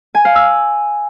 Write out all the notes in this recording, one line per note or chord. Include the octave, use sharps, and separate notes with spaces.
G#5
F5
E6